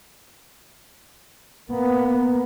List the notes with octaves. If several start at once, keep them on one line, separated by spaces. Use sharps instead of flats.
A#3 B3